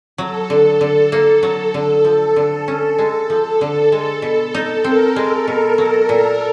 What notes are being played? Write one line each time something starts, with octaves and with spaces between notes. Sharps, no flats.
F#3 A4
D3
D3
A#3
F#3
D3
F3
D3
C#4
G#3
F3
D3
G#3 A4
B2
D#4
C4 A#4
G#3
B2
F#3
A#2